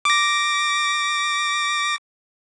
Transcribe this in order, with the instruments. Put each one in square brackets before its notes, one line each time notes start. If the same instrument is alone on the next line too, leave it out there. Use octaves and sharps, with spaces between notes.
[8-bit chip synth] D6 A#6